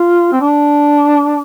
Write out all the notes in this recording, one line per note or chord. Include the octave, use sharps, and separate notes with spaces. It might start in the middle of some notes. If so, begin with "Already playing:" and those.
Already playing: F4
C4
D4